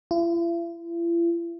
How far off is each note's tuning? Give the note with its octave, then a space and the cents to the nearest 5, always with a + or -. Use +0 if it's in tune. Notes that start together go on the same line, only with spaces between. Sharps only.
E4 +45